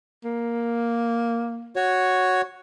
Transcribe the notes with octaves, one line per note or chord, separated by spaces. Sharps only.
A#3
F#4 C#5